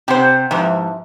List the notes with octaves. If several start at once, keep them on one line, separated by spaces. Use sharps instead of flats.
C3 C4 G4 C5 F#5
G#2 C3 E3 F3